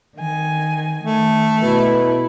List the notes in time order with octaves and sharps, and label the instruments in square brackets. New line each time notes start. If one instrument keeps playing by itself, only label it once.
[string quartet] D#3 G#5
[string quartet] D#3 [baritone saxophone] A3
[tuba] B2 [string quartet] E4 B4